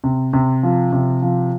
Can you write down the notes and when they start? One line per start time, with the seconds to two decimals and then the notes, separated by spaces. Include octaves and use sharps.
0.04 C3
0.33 C3
0.63 F3
0.93 C3
1.22 F3